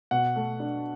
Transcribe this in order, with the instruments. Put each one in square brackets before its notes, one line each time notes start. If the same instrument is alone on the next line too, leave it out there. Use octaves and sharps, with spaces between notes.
[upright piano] B2 [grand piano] F#5
[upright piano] A3
D4